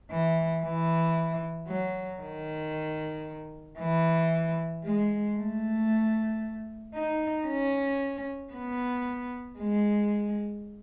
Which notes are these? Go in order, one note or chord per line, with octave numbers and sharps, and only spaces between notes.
E3
E3
F#3
D#3
E3
G#3
A3
D#4
C#4
B3
G#3